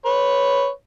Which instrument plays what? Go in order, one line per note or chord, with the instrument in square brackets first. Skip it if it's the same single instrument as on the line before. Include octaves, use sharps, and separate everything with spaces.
[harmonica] B4 C#5